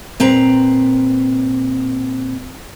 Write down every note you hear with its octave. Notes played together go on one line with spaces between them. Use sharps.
A#2 C4 B4 A#5